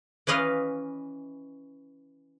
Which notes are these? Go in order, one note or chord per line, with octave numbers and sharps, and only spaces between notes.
E3 C#4 B4 D#5 F5